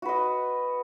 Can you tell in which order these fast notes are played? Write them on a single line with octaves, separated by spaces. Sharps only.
F#4 B4 D#5